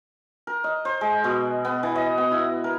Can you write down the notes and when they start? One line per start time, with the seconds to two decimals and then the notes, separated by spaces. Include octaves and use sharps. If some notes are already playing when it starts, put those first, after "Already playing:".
0.47 A#4
0.64 D#5
0.85 C5
1.01 G#3
1.24 B2
1.65 B3
1.83 E3
1.96 D#5
2.18 B3
2.32 E4
2.64 A#4